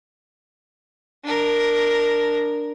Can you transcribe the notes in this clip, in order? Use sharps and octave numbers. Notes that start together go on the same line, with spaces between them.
D4 A#4